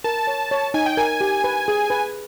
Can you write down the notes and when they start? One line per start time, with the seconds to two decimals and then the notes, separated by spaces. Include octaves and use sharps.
0.04 A#4 A5
0.27 C#5
0.51 C#5
0.74 D#4 G#5
0.86 G5
0.97 A#4 G#5
1.21 G4
1.44 B4
1.68 G#4
1.90 B4